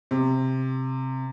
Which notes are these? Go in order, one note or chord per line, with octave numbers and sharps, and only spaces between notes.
C3